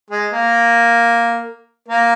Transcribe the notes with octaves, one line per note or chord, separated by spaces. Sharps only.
G#3
A#3
A#3